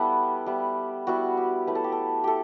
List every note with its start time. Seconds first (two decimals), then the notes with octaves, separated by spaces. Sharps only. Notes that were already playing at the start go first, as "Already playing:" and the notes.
Already playing: G3 B3 E4 G4 A4
0.46 G3 B3 E4
1.07 G3 B3 E4 F#4
1.37 G4
1.67 F#3 A3 E4 B4
1.75 A4
1.84 G4
1.92 A4
2.24 E4 G4 A4